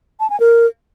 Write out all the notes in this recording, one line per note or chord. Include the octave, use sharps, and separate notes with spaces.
A5
G#5
A#4